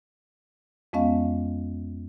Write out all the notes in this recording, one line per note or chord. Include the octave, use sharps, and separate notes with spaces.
F2 G#3 B3 C#4 D#5 F5